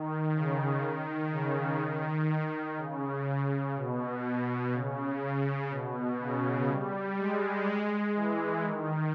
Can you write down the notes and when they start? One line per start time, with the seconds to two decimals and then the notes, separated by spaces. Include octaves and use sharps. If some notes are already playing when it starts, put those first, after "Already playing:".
Already playing: D#3
0.35 C#3
0.83 D#3
1.32 C#3
1.81 D#3
2.78 C#3
3.76 B2
4.25 B2
4.74 C#3
5.23 C#3
5.71 B2
6.19 C#3
6.69 G3
7.17 G#3
8.15 E3
8.65 D#3